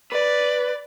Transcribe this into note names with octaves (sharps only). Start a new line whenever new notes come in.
B4 D5